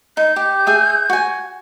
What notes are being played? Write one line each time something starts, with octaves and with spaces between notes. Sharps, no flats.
D#4 G6
G4
G#4 E5 D#6
F#4 G#5